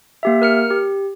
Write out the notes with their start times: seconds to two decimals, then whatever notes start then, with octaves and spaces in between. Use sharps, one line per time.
0.23 A#3 G4 E5
0.42 A#4 F6 C#7
0.70 G4